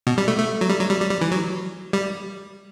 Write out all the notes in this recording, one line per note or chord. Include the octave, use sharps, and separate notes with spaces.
B2
G3
A3
A3
F#3
G3
F#3
G3
G3
G3
E3
F#3
G3